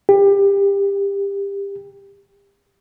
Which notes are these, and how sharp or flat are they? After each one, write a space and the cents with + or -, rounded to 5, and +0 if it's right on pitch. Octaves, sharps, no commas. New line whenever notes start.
G4 +25